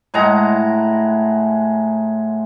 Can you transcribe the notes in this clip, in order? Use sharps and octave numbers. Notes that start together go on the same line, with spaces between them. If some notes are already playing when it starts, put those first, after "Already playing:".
A2 G#3 F#5 A#5